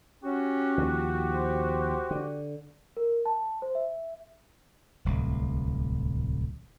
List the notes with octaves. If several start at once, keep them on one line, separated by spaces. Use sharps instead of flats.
C#4 F#4 G4
D#2 F3
C5
D3
A#4
A5
C5
E5
D1 C2 A2